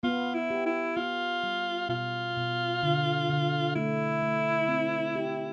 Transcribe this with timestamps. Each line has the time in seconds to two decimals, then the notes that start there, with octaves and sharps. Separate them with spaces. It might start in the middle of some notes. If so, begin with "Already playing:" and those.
0.03 B3 F4
0.34 E4
0.50 G4
0.66 E4
0.97 B3 F4
1.43 G3
1.89 B2 F4
2.36 B2
2.83 D3
3.29 D3
3.75 A3 E4
4.22 A3
4.68 C4
5.15 G4